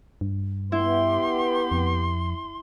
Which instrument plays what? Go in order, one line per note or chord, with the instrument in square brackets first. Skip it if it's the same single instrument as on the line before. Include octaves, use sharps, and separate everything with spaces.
[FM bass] G2
[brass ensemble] B3 G4 [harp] E4 [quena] C6
[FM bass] F2